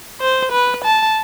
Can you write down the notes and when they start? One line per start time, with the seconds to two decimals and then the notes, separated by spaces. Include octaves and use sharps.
0.21 C5
0.52 B4
0.85 A5